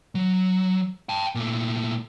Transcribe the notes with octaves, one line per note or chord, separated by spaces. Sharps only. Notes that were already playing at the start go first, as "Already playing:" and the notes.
F#3
G5 A5
A#2 A3